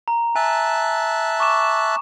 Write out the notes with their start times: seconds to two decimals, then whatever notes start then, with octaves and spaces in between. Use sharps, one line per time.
0.08 A#5
0.36 E5 G#5 A5 F#6
1.40 C#6 D6 E7